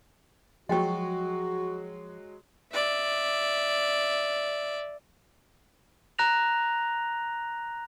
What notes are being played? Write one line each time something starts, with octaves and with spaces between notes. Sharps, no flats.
F3 F#3 G#3 F#4 D#5 G5 C#6
D5 E5
A#5 F#6 A#6 F7